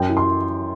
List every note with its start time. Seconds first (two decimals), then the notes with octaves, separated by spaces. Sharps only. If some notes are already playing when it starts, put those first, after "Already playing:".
Already playing: F#2 G5
0.09 E3
0.17 C6